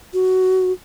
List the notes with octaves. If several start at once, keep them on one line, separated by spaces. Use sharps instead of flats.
F#4